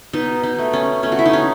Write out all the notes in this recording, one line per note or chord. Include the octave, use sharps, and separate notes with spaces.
B2 D#4
D#4
A3
C#4
A3 C#4
F#4
E4
D#4
C#4